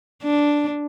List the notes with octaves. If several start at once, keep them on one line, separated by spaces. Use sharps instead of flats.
D4